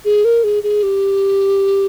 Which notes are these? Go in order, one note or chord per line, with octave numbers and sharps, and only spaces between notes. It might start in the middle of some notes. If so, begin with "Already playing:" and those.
G#4
A#4
G#4
G#4
G4